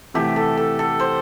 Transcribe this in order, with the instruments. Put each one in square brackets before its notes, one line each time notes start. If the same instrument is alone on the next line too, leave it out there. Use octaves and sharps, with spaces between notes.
[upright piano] C3 E3 A3 [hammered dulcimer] G4
[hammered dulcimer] A4
A4
A4
C5